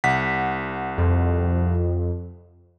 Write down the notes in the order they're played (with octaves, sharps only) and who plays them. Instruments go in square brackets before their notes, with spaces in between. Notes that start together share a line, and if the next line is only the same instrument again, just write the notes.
[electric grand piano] C2 F#5 B6
[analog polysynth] F2